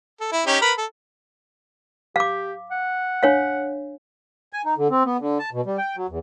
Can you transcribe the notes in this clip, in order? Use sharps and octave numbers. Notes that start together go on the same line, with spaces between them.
A4
E4
C#4 D#4 G4
A#4 B4 B5
A4
G4 F5 D6
F#5
D4 C#5 F5
G#5
D#4
D3
C4
B3
D3
A5
B2
G3
G5
F#3
E2